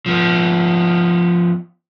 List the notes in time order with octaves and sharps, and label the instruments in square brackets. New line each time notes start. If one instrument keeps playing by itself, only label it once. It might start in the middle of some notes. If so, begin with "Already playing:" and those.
[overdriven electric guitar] F3 B3